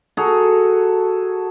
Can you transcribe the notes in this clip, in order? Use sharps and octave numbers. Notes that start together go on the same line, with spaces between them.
F#4 G#4 A4 A#5